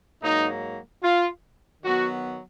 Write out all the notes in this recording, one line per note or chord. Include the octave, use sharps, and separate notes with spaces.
G#2 F#3 A#3 D#4
F4
D#3 F#3 B3 F#4